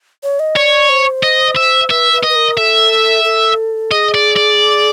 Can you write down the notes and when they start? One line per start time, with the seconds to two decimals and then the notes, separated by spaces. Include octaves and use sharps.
0.23 C#5
0.39 D#5
0.56 C#5 D5
0.89 C5
1.23 D#5
1.56 E5
1.91 B4 E5
2.13 B4
2.23 D#5
2.29 B4
2.35 A#4
2.58 A4 E5
3.24 A4
3.91 G#4 D#5
4.14 D5
4.36 D5